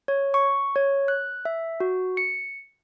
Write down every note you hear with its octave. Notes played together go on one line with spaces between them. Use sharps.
C#5
C#6
C#5
F#6
E5
F#4
C#7